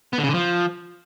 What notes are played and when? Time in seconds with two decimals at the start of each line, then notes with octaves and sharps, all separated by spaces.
0.13 B3
0.18 D3
0.24 C#3
0.29 D3
0.34 F3